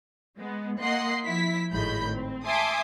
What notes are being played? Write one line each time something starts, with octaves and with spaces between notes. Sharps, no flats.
G#3 B3
A#3 D#5 F#5 C6 C7
F3 E4 B6
G#1 A2 D#3 G#3 B5 G6
C4
E5 G#5 A5 C6 D6 D#6